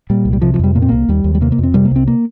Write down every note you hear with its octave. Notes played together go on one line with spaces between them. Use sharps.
A#2 G3
C2
G3
C3 F3
F3
F2 G3
A#2 A#3
C4
C2 A#3
D#2 G3
D#2
G3
C3 A#3
A#3
F2 C4
C3 G3
A#3
C2 C4
A#3